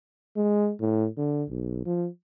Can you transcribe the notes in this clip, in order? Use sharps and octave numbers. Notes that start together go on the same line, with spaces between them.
G#3
A2
D3
B1
F3